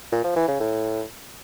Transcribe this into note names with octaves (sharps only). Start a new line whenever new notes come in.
A#2
F3
E3
C#3
A2